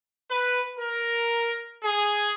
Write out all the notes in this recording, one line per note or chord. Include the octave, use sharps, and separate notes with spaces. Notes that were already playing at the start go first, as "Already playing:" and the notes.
B4
A#4
G#4